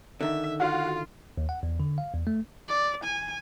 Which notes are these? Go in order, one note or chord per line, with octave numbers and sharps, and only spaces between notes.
D3 D#3 E5
F4 F#4 F5
D#2
F#5
E2
D3
F5
E2
A3
D5
G#5